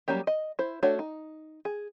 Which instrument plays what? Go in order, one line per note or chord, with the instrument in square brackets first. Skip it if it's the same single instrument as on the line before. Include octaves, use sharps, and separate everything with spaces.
[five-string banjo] F#3 G3 A#3 C#4 G4
D#5
E4 C5
A3 D4 F#4 A4 C#5
D#4
G#4